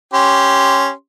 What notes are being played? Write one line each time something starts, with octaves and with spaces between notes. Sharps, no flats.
C#4 G4 C6